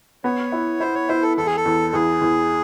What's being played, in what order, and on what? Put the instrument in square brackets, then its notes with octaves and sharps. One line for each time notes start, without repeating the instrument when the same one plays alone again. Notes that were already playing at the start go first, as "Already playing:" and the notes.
[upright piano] B3 [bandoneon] C#5
[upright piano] E4
[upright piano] E4 [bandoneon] C5
[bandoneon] C#5
[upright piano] E4 [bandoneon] C5
[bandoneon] A4
[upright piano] E2 [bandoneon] A4
[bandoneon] G#4
A4
[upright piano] E2
[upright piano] E2 [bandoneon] G#4
[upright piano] E2